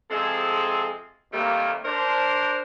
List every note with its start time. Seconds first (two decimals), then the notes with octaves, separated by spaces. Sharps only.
0.10 C3 F3 G#3 C4 G#4 A4
1.32 C3 D#3 G3 A3 A#3
1.84 D4 A#4 C5